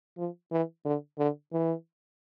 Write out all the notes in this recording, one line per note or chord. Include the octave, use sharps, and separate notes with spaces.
F3
E3
D3
D3
E3